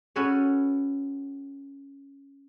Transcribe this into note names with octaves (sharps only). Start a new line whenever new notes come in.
C#4 F#4 A4 B4 C#5